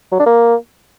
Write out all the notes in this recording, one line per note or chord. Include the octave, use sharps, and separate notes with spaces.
F#3
D4
A#3